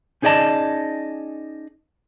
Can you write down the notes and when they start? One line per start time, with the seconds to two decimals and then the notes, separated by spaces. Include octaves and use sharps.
0.22 C#4 D#4 G#4 D5 D#5 A5